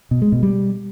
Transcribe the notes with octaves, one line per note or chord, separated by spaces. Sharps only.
B2
G#3
B2
G3